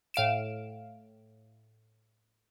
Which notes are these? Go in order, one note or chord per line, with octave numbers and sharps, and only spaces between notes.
A2 F5 D7 E7